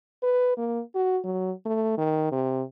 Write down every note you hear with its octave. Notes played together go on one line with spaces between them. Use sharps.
B4
A#3
F#4
F#3
A3
D#3
C3